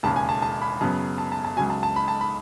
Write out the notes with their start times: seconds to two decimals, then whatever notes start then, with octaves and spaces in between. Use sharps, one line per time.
0.03 E1 D#2 C#3 A5
0.16 G#5
0.29 A5
0.42 A5
0.62 B5
0.81 F#2 C#3 F#3 B3 A5
1.18 A5
1.32 A5
1.45 A5
1.57 C#2 C#3 F#3 G#5
1.70 A5
1.83 A5
1.96 B5
2.08 A5
2.21 B5